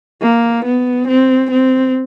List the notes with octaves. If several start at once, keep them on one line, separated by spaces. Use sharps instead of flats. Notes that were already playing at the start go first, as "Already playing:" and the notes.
A#3
B3
C4
C4